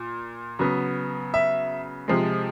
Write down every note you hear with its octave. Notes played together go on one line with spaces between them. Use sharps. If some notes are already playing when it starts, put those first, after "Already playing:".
Already playing: A#2
C#3 F#3 B3
E5
C3 F3 G#3